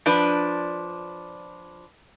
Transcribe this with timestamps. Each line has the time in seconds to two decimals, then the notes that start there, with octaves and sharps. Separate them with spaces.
0.06 F3 D4 B4